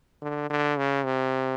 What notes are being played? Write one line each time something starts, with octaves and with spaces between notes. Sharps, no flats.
D3
D3
C#3
C3